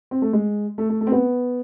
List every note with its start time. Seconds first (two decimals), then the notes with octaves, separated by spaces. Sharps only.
0.11 C4
0.22 A3
0.33 G#3
0.78 A3
0.89 A3
1.01 A3
1.07 C4
1.12 B3